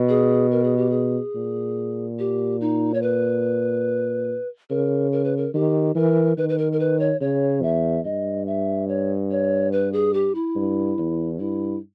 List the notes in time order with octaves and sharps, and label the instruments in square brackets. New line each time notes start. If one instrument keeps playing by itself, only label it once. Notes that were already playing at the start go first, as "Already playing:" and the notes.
Already playing: [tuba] B2
[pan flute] G#4
A#4
G#4
G4
G#4
[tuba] A#2
[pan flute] G4
D#4
C#5
B4
[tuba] C#3 [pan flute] A#4
[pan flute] A#4
B4
A#4
[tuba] D#3 [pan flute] G4
[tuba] E3 [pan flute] A#4
[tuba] D#3 [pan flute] B4
[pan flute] B4
A#4
A#4
B4
C#5
[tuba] C#3 [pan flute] C#5
[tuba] E2 [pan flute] E5
[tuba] G2 [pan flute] D#5
[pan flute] E5
C#5
C#5
B4
G#4
G4
E4
[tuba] G2
E2
[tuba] G2 [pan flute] E4